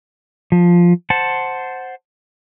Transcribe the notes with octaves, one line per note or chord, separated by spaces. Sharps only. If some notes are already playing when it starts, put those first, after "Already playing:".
F3
C5 F#5 A5